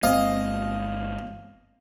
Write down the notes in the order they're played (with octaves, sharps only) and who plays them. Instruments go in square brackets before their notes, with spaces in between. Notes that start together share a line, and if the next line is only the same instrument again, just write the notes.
[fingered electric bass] G1 G#3 A#3 [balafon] C4 C5 [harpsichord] D#5 [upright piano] F5